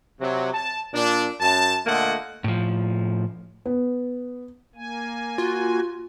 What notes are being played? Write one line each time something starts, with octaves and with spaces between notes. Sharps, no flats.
C3 F#3
A5
A#2 D4
F#2 A5
A#2 D3 A3 A#3 D#5 F#5
A2 F3
B3
A#3 G#5
F4 F#4